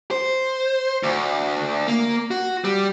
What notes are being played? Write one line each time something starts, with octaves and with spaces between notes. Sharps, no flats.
C5
D2
A#3
F#4
G3